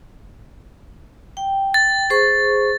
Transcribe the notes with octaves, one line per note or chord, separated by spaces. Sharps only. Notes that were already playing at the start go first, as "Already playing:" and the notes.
G5
A6
G#4 C5 C#6